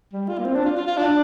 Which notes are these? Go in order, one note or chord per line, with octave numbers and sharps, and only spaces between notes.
G3
F4
A#3
C4
D4
F4
F4
F4
D4